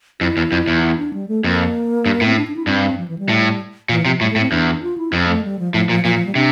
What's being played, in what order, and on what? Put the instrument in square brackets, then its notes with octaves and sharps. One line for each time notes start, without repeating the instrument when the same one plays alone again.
[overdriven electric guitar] F2 [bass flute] E4
[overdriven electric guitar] E2
F2
E2
[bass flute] E4
D4
G3
A3
[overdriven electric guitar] F2 [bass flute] A#3
[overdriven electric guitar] G2
[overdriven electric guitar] A2 [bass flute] C4
[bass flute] D4
D4
E4
[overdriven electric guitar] G2 [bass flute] C4
[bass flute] F3
E3
G3
[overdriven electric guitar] A2
[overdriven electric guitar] A#2 [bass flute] E3
[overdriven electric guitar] C3 [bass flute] F3
[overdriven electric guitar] A2 [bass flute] G3
[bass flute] A3
[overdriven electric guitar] A2
[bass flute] C4
[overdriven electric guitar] E2 [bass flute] D4
[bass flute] F4
E4
[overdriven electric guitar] F2 [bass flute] C4
[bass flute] A3
G3
F3
[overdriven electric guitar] A2 [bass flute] F3
[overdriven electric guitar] A#2 [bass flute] F3
[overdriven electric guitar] A#2 [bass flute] F3
[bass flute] F3
G3
[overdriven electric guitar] C3 [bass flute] D4